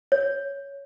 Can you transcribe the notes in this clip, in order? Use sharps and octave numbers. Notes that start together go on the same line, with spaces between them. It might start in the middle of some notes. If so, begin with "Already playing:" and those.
C#5